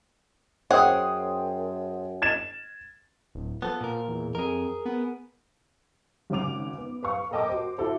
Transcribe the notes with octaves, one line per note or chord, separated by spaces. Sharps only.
F#2 C#4 G#4 C5 F#5 G5 D#6
G#6 A6 E7
D1
F3 B3 A4
A#2 A#4
E2
F2 G#4 A#4
B3
G#1 C#3 C#4 D6 F7
B3
B4 F5 C#6
A4 A#4 D#5 G5 A5 D6
F#4 C5
E4 F#4 A4 C5